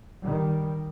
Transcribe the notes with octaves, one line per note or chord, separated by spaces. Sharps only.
D#3 G3